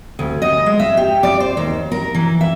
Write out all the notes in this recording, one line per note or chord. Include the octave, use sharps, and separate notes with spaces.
D2
D#5
G#3
E5
G4
D5
C5
D#2
A#4
E3
E5